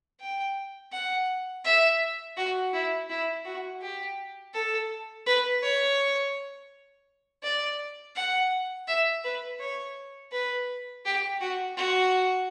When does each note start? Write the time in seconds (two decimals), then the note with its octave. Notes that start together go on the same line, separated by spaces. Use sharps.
0.20 G5
0.92 F#5
1.65 E5
2.37 F#4
2.73 E4
3.10 E4
3.45 F#4
3.82 G4
4.54 A4
5.26 B4
5.63 C#5
7.43 D5
8.16 F#5
8.88 E5
9.24 B4
9.60 C#5
10.32 B4
11.05 G4
11.41 F#4
11.77 F#4